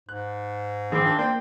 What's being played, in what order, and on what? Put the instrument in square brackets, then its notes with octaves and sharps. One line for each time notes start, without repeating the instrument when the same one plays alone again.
[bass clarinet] G#2 [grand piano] F#6
[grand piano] D#3 B5 D6 [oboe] C4 [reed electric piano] G#4 E6
[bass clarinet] D4 [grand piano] F4
[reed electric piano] A#3 [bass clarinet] C5 [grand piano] D5 [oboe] G5